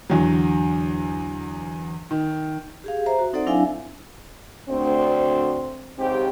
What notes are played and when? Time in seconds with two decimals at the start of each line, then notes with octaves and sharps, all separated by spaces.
0.10 E2 D3 F#3
2.11 D#3
2.84 G4 G#4 F5
3.06 C5 E5 A#5
3.19 F#4
3.33 C4 D#4 A4 C5 D5 F#5
3.46 F#3 D4 E4 E5 F5 G#5
4.69 D2 C4
5.99 G#2 C#3 C4 G4